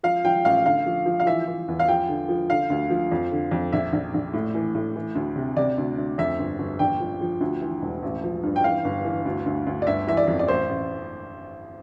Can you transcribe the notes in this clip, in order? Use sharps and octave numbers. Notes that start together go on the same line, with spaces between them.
F3 F5
F3 G5
A1 F5
D3 F5
F3
F3
F5
E3 E5
E3
E2
F5
F3 G5
D3
F3
D3 F5
D2
F3
F2
D3
F2
A#1 E5
A#1
A#1
A2
E3
A2
E3
D2
C3
C3 D5
D2
D2
F2 E5
G1
G1
A#1 G5
F3
F3
D2
E3
E1
A1
F3
G2
G5
E3 F5
G1
E3
D2
D2
D2
D5
G1 E5
E3 E5
D5
F2
D5
A1 C5
A1